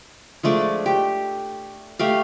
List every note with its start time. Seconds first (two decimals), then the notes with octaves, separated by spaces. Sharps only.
0.43 F3 G#3 A3 D4
0.86 G4
1.99 A3 G4 F5